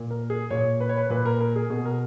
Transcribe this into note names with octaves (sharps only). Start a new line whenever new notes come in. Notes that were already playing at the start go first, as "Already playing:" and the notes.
Already playing: A#2
A#4
G#4
A#2 C#5
B4
C#5
B4
A#2 B4
A#4
A#4
G#4
B2 G#4
A#4